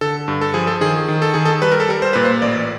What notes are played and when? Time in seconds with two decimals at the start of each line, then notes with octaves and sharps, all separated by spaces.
0.01 D3 A4
0.28 G2
0.41 A4
0.54 F3 G#4
0.67 A4
0.81 D#3 G#4
1.08 D#3
1.22 A4
1.34 D#3 G#4
1.45 A4
1.62 G3 B4
1.72 A#4
1.80 A4
1.89 G3 A#4
2.02 C5
2.13 A#2 B4
2.25 C5
2.42 A1 D5